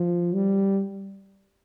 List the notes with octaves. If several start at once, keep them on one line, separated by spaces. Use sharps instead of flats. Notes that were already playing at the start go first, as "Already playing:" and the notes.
Already playing: F3
G3